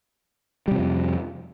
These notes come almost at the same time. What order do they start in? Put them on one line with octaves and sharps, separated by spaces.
G3 C3 F3 F2